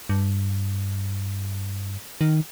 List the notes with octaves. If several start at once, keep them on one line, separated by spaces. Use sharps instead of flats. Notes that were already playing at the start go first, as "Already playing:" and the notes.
G2
D#3